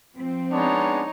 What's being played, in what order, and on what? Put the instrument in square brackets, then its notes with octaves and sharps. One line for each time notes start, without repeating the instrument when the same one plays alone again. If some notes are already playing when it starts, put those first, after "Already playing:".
[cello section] F3 C4
[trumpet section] G#3 B3 D4 [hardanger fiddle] D#4 C#5